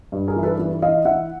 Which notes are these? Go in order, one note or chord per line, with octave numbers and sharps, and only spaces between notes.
G2
G#4 A#4
E3
A4 B4
E3
E3 D#5 F5
E3 E5 F#5